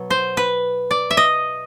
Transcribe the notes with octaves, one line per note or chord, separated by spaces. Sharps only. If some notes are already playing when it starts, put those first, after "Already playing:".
Already playing: B2 F#3
C5
B4
D5
E5
D#5